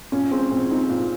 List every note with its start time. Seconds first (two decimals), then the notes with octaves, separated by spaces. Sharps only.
0.12 A#2 C#4
0.31 G#3 C4
0.51 A#2 C4
0.70 C4 D#4
0.90 A#2
1.00 F4